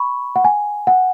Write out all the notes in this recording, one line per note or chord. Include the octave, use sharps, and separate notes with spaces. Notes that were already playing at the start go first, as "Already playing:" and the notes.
Already playing: B5 C#6
F#5
G#5
F#5